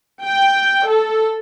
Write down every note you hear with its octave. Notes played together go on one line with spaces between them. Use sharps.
G5
A4